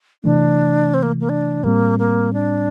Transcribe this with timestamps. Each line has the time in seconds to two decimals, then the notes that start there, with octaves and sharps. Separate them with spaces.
0.24 C3 E3 A3 D4
0.94 C4
1.03 A#3
1.20 A#3
1.29 D4
1.64 A2 G3 A#3 C4
1.99 A#3
2.33 D4